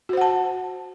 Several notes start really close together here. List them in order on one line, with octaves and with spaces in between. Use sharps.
F#4 C5 F#5 A5